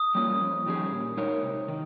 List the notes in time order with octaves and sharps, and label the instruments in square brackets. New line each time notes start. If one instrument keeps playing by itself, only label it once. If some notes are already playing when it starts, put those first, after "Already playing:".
Already playing: [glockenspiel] D#6
[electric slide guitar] G3 A#3 C#4 F4
F2
D#3 G3 C#4 G#4
A#2
G#3 D#4 A#4 C#5
C3
D#3